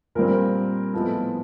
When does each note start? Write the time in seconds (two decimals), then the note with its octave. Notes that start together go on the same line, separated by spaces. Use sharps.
0.15 A#2 G3 C4 A#4
0.93 A2 F3 G#3 B3 A4